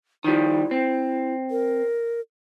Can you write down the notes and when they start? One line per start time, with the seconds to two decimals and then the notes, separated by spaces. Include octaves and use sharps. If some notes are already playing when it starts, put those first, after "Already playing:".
0.24 D#3 F3 G3 E4
0.71 C4
1.51 A#4